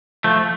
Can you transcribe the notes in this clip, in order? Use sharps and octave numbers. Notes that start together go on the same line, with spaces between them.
F3 A3